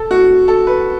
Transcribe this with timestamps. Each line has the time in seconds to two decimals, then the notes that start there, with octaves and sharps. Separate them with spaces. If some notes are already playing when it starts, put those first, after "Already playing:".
Already playing: A4
0.11 F#4
0.48 A4
0.67 B4